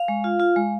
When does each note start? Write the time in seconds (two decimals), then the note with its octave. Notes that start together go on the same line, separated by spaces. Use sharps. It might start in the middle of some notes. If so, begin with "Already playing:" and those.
Already playing: F5
0.08 G#3
0.24 F4
0.40 F4
0.56 G#3